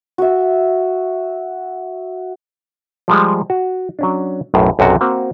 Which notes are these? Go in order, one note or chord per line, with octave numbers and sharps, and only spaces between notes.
F#4 E5
F3 G3 G#3
F#4
F#3 C#4 D4
B1 F#2 A2
B1 F#2 C3 F#4
A#3 C4 F#4